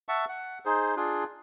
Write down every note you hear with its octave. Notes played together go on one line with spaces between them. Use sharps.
E5 F#5 A5 C#6
F#5
D#4 G#4 C5
D4 F4 G#4